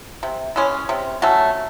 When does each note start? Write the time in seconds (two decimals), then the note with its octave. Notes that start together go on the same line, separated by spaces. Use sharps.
0.23 C3
0.56 E3 G#3 C#4
0.89 C3
1.22 F#3 A3 C#4